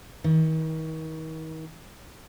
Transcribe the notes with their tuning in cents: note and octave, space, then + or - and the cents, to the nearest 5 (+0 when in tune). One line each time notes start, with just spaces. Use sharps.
D#3 +40